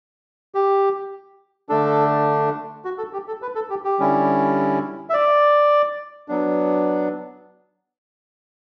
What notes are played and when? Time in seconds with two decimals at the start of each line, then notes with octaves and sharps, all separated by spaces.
0.55 G4
1.69 D3 A3 D4 A4
2.85 F#4
2.98 A4
3.13 G4
3.28 A4
3.42 B4
3.55 A4
3.70 G4
3.84 G4
3.99 D3 G3 C#4 E4
5.10 E5
5.13 D5
6.28 F#3 B3 D4